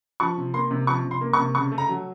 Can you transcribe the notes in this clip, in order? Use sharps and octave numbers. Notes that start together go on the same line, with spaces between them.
F3 C#6
C3
A#3 C6
C3
F3 C#6
C3
C6
A#3
C#6
C3
C#3 C#6
A3
A#5
F#3